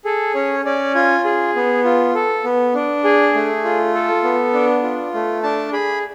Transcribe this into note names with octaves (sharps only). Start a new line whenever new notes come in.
G#4 A4
C#4 C#5
C#4 D5
F4 G#5
G#4
B3
F4
A4
B3
D4
G#4
A3
F4
A4
B3
D4
F4
A3
D4 A5
G#4 B5